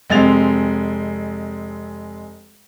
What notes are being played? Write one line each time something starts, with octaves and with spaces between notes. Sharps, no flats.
F1 G#3 C4 A6 F7